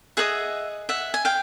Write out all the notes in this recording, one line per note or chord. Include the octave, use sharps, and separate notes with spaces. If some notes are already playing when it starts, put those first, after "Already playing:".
G#4 B4 D#5 E5 F#5
E5 F#5
G#5
F5 G5